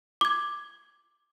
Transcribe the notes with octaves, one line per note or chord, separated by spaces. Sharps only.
D6 G#6